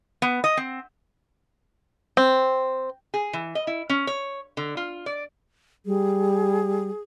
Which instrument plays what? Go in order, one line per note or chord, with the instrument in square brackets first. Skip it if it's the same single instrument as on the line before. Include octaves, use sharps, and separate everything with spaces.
[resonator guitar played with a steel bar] B3
D#5
C4
[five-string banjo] C4
[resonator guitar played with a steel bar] G#4
E3
D#5
E4
C#4
C#5
D3
F4
D5
[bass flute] G3 [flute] G#4